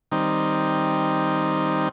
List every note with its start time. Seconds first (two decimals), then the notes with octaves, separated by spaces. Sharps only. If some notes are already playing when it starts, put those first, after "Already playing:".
0.12 D#3 G3 C4 D#4